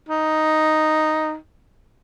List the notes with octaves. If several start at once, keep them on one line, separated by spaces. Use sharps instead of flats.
D#4